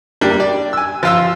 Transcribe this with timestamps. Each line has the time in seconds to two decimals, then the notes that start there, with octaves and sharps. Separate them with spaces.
0.21 G3 A#3 D4
0.40 D5
0.73 G#5 E6
1.03 F3 F4 E6